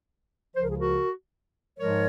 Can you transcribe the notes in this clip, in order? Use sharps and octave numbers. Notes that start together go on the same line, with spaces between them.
C#2 C#3 F3 C5
A#4
G#4
F#4 A#4
G#2 F3 G#3 A#4 C#5